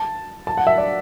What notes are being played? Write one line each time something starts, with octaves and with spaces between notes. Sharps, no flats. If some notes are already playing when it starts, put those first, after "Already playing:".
Already playing: A5
A5
F#5
E5
D5